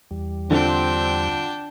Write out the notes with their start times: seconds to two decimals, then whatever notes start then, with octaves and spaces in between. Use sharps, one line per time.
0.11 E2 G3
0.51 D3 C4 D4 F4 G5